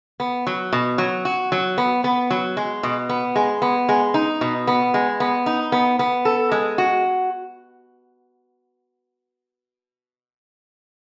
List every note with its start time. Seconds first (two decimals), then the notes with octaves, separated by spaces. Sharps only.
0.20 B3
0.47 F#3
0.73 B2
0.98 F#3
1.25 F#4
1.52 F#3
1.78 B3
2.04 B3
2.31 F#3
2.57 G#3
2.83 B2
3.09 B3
3.36 G#3
3.62 B3
3.89 G#3
4.14 D#4
4.41 B2
4.67 B3
4.94 G#3
5.20 B3
5.46 D#4
5.72 B3
5.99 B3
6.25 A4
6.52 G#3
6.78 F#4